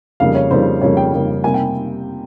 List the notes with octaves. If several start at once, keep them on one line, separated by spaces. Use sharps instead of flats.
F2 C#3 G3 A#3 F5
C#5
F2 C#3 G3 A#3 C5
F2 C#3 G3 A#3 C#5
G5
F2 C#3 G3 A#3
C3 G3 A#3 G#5
G5